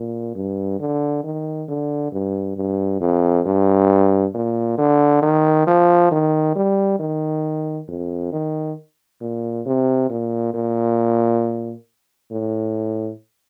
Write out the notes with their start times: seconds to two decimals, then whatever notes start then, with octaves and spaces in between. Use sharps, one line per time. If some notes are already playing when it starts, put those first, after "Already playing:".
Already playing: A#2
0.35 G2
0.80 D3
1.24 D#3
1.68 D3
2.12 G2
2.57 G2
3.01 F2
3.45 G2
4.34 A#2
4.78 D3
5.22 D#3
5.67 F3
6.12 D#3
6.56 G3
6.99 D#3
7.88 F2
8.32 D#3
9.21 A#2
9.66 C3
10.10 A#2
10.54 A#2
12.31 A2